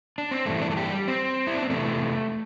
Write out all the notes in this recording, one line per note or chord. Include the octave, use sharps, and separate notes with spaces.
D4
C4
G2 E3 A3
D4
A4
G4
G3
C4
E4
D4
C4
E2 C3 E3 A3